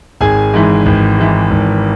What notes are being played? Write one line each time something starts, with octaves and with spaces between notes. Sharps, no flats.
G#1 G#4 G#5
G#2 E3
G#1
G#2 E3
G#1